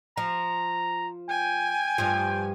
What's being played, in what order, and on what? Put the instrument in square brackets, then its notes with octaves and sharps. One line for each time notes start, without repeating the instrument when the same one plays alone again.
[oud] F3 [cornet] A#5
[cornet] G5 [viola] G#5
[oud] G2 F3